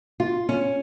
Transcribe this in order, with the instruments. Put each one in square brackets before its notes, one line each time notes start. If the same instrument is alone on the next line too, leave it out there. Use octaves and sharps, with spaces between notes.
[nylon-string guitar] F4
C#4